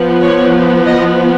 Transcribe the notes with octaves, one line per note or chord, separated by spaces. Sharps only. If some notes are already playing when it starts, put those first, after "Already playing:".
Already playing: F3 B3
C#5
D#5